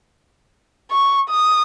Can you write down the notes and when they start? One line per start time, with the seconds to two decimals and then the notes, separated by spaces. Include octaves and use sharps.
0.91 C#6
1.30 D#6